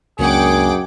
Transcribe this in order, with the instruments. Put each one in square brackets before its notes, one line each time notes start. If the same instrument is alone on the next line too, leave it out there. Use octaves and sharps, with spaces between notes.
[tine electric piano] C#2 A#3 D4 [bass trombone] F#2 [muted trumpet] G#4 [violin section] F#5 G5 D6